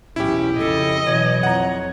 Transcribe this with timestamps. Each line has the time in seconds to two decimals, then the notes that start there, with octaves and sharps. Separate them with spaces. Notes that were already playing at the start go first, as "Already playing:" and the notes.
0.16 B1 E2 C#4 E4 G4
0.59 F2 C#3 A4 D#5
1.06 B2 E3 F#3 C#5
1.43 F2 F#5 A#5